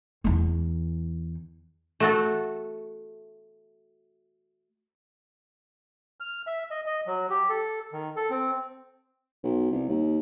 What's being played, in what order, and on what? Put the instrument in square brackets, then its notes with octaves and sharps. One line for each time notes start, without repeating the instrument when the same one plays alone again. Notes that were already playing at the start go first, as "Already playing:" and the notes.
[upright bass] E2 E3
[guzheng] A3 F#4 A4
[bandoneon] F6
E5
D#5
D#5
F#3
G4
A4
D#3
A4
C4
[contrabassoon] B1
C2
D#2